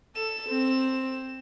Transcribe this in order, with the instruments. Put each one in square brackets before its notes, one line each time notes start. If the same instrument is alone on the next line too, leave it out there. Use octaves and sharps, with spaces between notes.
[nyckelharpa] A4 [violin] E7
[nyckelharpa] C4